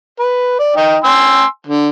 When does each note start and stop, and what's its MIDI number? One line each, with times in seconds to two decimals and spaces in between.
0.19 0.58 71
0.59 0.76 74
0.76 0.97 63
0.76 0.97 75
0.76 0.97 79
1.04 1.44 80
1.04 1.44 84
1.04 1.44 88
1.67 1.89 50